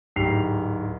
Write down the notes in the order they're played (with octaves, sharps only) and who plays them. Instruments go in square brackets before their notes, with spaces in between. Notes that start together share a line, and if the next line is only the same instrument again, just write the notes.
[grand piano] D1 G#2 G4 C7 F7